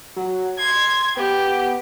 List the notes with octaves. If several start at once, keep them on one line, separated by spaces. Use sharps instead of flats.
F#3
C6 G#6
B3 G4